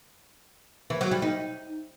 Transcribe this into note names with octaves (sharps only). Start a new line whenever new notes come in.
E3
F#3
G3
D#4